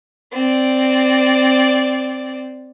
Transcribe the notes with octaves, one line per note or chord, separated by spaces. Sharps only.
C4 D5